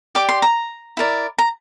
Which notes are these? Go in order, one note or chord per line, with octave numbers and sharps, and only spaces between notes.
G4 D5 D6
C6
A#5
E4 A#4 D5
A#5